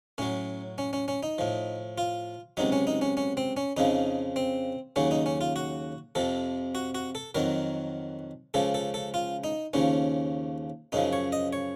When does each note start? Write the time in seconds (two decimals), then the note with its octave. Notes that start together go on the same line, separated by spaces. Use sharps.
0.18 A2 F#3 C#4
0.78 C#4
0.93 C#4
1.08 C#4
1.23 D#4
1.38 A2 F3
1.98 F4
2.57 C#2 C3 F#3 D#4
2.72 C#4
2.87 D#4
3.02 C#4
3.17 C#4
3.37 C4
3.57 C#4
3.77 F2 C#3 F3 D#4
4.36 C4
4.96 D#2 C#3 F#3 C#4
5.11 D#4
5.26 C#4
5.41 F4
5.56 F#4
6.15 F2 C3 F3 A4
6.75 F#4
6.95 F#4
7.15 A4
7.35 F2 D#3 F#3 A#4
8.54 C#2 C#3 F3 A4
8.74 A4
8.94 A4
9.14 F4
9.44 D#4
9.73 D#2 C#3 F3 C#4
10.92 F#2 C#3 F3 D#4
11.13 C#5
11.32 D#5
11.53 C#5